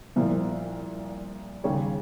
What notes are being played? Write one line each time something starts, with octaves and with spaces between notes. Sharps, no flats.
C2 A#2 F3
D#2 C#3 G3 C#5